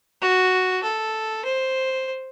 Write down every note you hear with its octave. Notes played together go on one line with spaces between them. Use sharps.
F#4
A4
C5